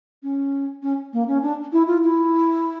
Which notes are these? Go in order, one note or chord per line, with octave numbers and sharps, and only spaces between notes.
C#4
C#4
A#3
C#4
D4
E4
F4
E4